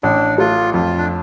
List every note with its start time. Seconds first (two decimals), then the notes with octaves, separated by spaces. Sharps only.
0.03 A1 D4
0.38 A3 F4
0.74 F2 F4
0.98 D4